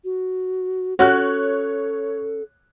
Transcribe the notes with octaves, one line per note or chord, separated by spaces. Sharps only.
F#4
C#4 F#4 A4 C#5 F#6